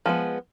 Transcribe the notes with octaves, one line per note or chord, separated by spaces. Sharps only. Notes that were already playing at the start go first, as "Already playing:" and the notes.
F3 G#3 B3